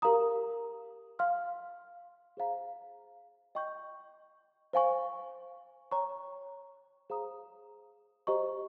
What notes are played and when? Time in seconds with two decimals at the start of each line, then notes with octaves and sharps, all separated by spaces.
0.02 G4 A#4 F5 A#5 D#6
1.19 F5 C6 F6
2.37 G#4 C5 F5 A#5
3.55 D#5 G5 C#6 G6
4.73 C5 F5 G#5 C#6
5.92 C#5 G5 A#5 C#6
7.10 G#4 C5 F5 A#5 D#6
8.27 G4 C5 D#5 A#5 C#6